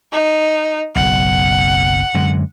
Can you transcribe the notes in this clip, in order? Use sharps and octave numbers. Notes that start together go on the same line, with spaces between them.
D#4
F#1 B1 F#5
F#2 D3 G#3